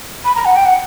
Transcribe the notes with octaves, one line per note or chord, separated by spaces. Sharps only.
B5
A#5
F#5
G5
F#5